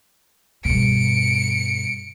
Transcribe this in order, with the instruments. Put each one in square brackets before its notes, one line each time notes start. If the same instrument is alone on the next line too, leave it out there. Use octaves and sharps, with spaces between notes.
[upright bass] G2 B2 [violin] C#7 D7